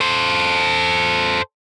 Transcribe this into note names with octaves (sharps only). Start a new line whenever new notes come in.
A4 C5